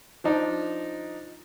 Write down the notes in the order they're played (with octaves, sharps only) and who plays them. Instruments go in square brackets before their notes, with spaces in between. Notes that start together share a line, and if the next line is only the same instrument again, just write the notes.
[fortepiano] F3 D4 D#4